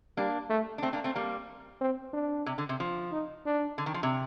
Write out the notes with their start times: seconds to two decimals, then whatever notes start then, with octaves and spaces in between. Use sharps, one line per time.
0.17 G3 A#3 D4
0.50 A3
0.78 D4
0.83 A3 C4
0.93 A#3 D4
1.04 A3 C4
1.16 G3 A#3
1.81 C4
2.14 D4
2.46 C3
2.58 D3
2.69 C3
2.80 F3
3.12 D#4
3.46 D4
3.78 D3
3.86 D#3
3.94 F3
4.03 C3